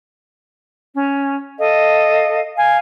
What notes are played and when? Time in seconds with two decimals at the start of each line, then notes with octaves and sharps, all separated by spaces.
0.95 C#4
1.58 A4 D#5 F5
2.56 F5 G#5